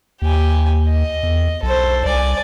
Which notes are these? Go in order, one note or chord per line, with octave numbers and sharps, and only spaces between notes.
D#2 G4 G#5
D#5
E2
B1 A4 C5
C2 D5 G#5